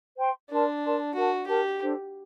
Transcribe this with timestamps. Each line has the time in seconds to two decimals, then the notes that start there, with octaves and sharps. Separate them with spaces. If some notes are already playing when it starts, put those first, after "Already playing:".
0.18 C5 G5 C6
0.50 D4 A#4 D5 A5 C6
0.83 A#4 D5 A5 C6
1.15 F#4 A#4 F#5 A5
1.47 G4 A#4 F#5 A5
1.80 D4 A4 C5